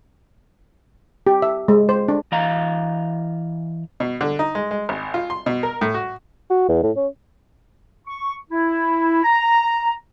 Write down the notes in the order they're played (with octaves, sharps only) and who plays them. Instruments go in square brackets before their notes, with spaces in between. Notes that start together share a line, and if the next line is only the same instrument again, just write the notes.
[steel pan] G4
E5
G#3
C5
D4
[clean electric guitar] E3 D#5 F5 A#5
[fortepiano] B2
D3
D#4
G#3
G#3
G#1
F4
C6
B2
A#4
A2
F#4
[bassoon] F#4
E2
A2
C#4
[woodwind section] C#6
E4
A#5